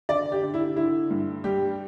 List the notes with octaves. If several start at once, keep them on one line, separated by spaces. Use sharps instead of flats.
D3 D5
G4
D3
E4
D3 E4
G2
G3 G4